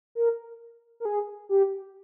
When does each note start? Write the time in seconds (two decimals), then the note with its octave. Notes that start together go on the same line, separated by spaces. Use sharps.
0.15 A#4
1.00 A#4
1.05 G#4
1.49 G4